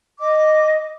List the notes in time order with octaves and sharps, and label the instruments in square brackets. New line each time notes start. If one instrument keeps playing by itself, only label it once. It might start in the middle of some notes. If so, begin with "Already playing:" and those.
[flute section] D#5 D6